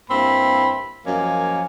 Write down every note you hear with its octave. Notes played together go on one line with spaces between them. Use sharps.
G2 A#3 C4 E4 B5
F#2 F3 A#3 C#5 D#5 G#5